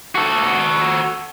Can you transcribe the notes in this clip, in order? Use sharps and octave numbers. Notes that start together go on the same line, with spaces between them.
F#4 A4